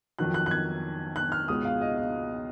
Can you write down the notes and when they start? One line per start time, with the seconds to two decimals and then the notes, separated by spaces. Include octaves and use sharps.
0.19 F2 D#3 F#3 F#6
0.34 F#6
0.46 F#6
0.51 G#6
1.16 F#6
1.32 F6
1.48 C#2 B2 G#3 D#6
1.65 F5
1.81 D#5
1.97 F5